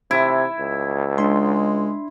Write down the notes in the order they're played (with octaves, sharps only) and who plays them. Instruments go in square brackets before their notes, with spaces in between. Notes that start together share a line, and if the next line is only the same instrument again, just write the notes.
[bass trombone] C3 [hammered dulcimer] E4
[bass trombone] C#2
[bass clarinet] G#3 [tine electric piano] D4 C6